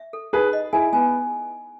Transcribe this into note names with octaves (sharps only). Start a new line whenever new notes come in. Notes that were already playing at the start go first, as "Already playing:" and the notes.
Already playing: E5
A4
D#4 G#4 B4
D#5
E4 G#4 G#5
B3 G#5